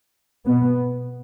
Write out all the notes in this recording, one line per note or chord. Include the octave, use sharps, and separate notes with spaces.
B2 B3